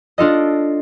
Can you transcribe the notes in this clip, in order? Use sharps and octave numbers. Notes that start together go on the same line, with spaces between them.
D4 F4 A4 D#5